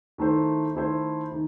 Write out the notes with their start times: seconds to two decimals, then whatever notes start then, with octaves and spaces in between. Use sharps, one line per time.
0.18 D#3 A3 E4 A4 C5
0.75 D#3 A3 E4 A4 C5
1.32 D#3